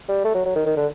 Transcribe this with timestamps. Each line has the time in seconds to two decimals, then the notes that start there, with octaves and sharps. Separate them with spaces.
0.09 G3
0.24 A3
0.34 F#3
0.45 F#3
0.55 D#3
0.65 D#3
0.77 D3